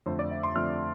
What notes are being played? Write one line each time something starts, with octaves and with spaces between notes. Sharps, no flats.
F2 D3 A3 C5
D5
E5
C6
F2 D3 A3 F6